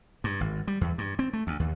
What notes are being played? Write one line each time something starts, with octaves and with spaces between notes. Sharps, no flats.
G2
G#1
G3
E2
G2
C4
A3
D2
D#2